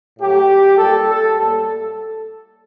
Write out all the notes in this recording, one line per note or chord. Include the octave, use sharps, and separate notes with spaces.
A2 F#3 A3 G4
A#2 G3 A#3 A4
A4
A2 G3 A#3 A4